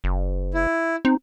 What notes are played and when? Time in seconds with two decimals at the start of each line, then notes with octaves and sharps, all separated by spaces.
0.04 F#1
0.54 E4
1.05 C4 D#4